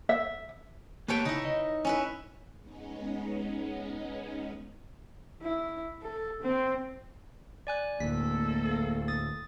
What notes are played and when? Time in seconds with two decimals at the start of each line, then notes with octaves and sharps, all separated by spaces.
0.09 E5
1.08 A#3 G4 B4 C#5 G5 A5
1.25 C#3 D#4 E4
1.45 D#5
1.85 C#4 E4 B4
2.59 G#3 B3 C#4 D#4
5.42 E4
6.03 A4
6.42 C4
7.67 D5 G#5 F#6
8.00 D2 A2 A#3 A4 B6
8.71 F5
9.08 D#6 A6